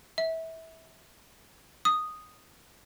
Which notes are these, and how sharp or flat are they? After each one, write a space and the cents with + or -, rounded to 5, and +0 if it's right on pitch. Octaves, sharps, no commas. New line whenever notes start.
E5 -25
D#6 -5